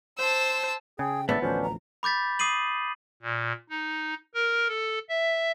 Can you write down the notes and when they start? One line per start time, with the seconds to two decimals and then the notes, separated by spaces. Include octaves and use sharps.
0.19 C5 A5 E6
0.99 C#3 G#4 G5
1.29 G#1 A2 C#3 B3 D5 E5 A5
1.42 A1 D2 F3 C#4 D4 C5
1.63 A#5
2.03 B5 D6 G6 A6 B6
2.39 D6 D#6 C7 D#7 F#7
3.22 A#2
3.70 D#4
4.34 A#4
4.68 A4
5.09 E5